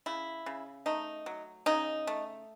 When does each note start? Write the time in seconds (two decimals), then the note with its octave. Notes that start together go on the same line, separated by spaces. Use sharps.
0.06 C#3 E4
0.46 C#3
0.86 A3 D#4
1.26 F#3
1.66 C#3 D#4
2.07 A3